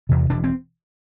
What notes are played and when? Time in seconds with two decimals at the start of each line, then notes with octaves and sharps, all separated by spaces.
0.09 E2 C3
0.30 E1 D4
0.44 C4